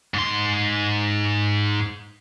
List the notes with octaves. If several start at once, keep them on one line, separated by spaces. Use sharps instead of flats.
G#2 C6